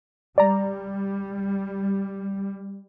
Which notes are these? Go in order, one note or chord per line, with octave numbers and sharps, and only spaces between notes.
G3 D5 A#5